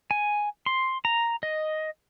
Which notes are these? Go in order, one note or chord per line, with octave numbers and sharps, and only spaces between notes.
G#5
C6
A#5
D#5